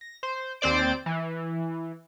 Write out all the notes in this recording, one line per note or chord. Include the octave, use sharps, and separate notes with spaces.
A#6
C5
D#2 C4 C5 D5 D7
E3